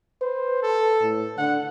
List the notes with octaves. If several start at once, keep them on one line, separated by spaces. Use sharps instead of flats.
B4 C5
A4
A2
D3 F#5